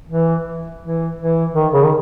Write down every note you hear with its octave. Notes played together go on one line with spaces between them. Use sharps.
E3
E3
E3
D#3
C#3
D#3